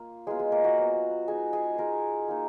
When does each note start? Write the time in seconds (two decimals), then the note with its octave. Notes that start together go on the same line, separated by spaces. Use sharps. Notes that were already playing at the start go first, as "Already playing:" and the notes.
Already playing: A#3 F4
0.27 F#3 G#3 B3 F4 G#4
0.39 G#3 G#4
0.52 A#3 A#4
0.64 F#4 F#5
0.77 F#3 B3 F4
1.27 G#3 D#4 G#4 G#5
1.53 G#4 G#5
1.78 G#3 D#4 A#4 A#5
2.29 A#3 D#4